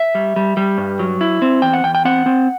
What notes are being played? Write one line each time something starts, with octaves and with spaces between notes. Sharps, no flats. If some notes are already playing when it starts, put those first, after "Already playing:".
Already playing: E5
G3
G3
G3
G2
F#3
E4
C4
E2 G5
F#5
E2 G5
G5
C4 F#5
C4